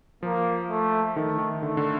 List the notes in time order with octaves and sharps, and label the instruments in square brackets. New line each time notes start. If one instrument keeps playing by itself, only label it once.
[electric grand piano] F3 [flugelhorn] A#3
[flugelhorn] A3
[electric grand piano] D#3 [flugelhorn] A3
[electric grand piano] D#3
[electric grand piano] D3 [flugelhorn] A3
[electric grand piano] D3